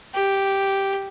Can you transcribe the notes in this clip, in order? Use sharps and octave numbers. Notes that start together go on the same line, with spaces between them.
G4